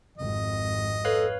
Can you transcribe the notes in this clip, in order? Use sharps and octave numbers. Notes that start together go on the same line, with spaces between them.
G#1 F2 D#5
A4 B4 C#5 F5